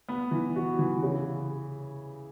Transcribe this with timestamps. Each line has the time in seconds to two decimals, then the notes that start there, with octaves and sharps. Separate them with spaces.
0.08 B3
0.31 E3
0.56 F#4
0.79 E3
1.02 C#3